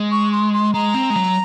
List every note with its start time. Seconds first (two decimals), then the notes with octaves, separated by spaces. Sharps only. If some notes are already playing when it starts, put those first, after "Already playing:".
Already playing: G#3
0.11 C#6
0.32 C6
0.54 C6
0.74 G#3 A#5
0.94 C4
1.10 G#3
1.16 F#3